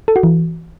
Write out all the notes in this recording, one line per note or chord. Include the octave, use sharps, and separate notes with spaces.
A4
F#4
E3